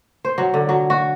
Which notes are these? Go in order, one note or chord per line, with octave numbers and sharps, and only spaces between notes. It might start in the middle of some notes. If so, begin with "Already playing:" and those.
C5
F#3
D3
F#3
F#4